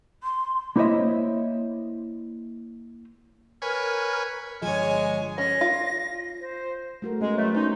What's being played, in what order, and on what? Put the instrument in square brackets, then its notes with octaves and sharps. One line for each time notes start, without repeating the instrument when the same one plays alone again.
[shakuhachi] C6
[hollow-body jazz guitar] A#3 E4 C5 C#5 D#5 E5
[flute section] A#4 F6 [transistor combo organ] B4 C#5 G#5
[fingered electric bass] G1 F3 [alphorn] G#3 [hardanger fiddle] C#5 G#5
[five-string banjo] C#4 [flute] A#6
[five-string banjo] F4
[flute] C5
[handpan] A3 F#4 A#4
[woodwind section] G#3 [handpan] B3 C#4
[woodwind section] F#3 A3
[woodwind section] C#4 D#4 [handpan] C5